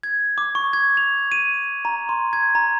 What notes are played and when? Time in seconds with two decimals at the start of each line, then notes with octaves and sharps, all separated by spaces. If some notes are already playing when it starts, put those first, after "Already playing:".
0.03 G#6
0.38 D6
0.55 C#6
0.73 G#6
0.97 F7
1.32 D#7
1.85 A#5
2.09 C6
2.33 G#6
2.55 A#5